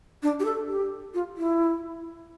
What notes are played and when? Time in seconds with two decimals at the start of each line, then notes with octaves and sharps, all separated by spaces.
0.23 D4
0.40 G4
0.45 A4
0.68 G4
1.14 F4
1.37 E4